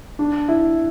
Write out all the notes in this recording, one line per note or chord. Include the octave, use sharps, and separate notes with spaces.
D4
E4